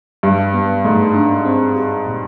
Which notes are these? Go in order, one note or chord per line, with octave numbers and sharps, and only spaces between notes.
G2 G3
B3
G#2 A3
D4
C4
G4
A#2